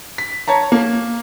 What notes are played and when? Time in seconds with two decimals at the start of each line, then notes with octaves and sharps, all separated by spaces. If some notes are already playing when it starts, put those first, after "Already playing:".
0.18 B6
0.48 C#5 A5 A#5
0.72 A#3